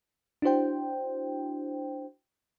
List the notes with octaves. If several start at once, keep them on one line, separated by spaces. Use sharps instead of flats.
D4 E4 F#4 C5 G5